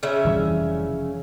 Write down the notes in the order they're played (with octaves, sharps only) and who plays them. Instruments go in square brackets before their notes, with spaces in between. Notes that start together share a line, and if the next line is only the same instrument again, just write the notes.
[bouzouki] C#3 C#4 E5
[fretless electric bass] F1 E3 G3